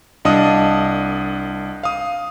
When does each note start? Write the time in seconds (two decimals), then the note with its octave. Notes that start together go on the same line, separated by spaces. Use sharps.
0.25 C2 D4 D#5 F5 A5 D#6
1.83 F5 D#6